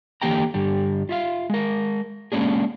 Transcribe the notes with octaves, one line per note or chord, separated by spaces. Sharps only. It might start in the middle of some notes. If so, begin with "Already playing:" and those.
D3 E3 A#3 G4 G5 A#5
G2 D3 G3
F4 E5 F5
G#3 A#4
G#3 A#3 C#4 D4 G#4